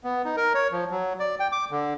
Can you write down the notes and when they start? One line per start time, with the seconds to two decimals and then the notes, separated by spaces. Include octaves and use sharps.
0.04 B3
0.25 D#4
0.37 A#4
0.54 C#5
0.72 F3
0.91 F#3
1.20 D5
1.40 G5
1.52 D6
1.71 D3